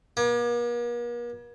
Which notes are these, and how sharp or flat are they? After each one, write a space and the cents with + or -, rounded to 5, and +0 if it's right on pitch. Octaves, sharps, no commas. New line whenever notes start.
A#3 +45